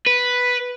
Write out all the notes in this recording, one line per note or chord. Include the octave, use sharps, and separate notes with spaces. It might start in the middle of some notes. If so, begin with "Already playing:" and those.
B4